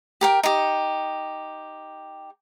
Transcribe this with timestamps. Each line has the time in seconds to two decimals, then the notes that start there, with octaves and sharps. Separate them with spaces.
0.21 G4 A#4 G5
0.43 D#4 G4